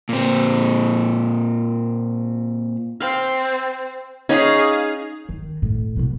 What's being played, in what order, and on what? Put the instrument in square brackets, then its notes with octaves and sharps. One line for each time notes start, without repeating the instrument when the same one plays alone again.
[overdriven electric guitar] A#2 C4
[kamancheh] C4 [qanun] F5
[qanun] C#4 D#4 [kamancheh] G#4 F5
[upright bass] D#3
A2
C2 B2